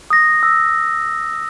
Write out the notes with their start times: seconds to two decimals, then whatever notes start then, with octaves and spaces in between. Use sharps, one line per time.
0.10 D#6 A#6
0.43 E6